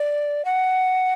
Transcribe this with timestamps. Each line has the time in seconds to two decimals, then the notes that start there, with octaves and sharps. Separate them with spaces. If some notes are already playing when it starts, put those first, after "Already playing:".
Already playing: D5
0.45 F#5